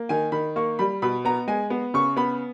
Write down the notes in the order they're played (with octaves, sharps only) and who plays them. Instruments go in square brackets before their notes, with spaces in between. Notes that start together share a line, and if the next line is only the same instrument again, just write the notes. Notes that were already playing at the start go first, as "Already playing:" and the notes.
Already playing: [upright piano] A#3
D#3 G#5
D#3 B5
A#3 C#6
G3 B5
B2 B5
B3 A#5
G#3 G#5
B3
C#3 C#6
B3 B5